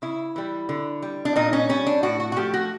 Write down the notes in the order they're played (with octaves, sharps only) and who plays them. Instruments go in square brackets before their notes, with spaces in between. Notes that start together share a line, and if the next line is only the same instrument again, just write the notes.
[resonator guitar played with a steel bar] C#3 E4
E3 G3
D3
G3
D4
A#2 D#4
C#4
G3 C#4
D4
A2 F#4
F#4
F#4
F3 A3 G4
F#4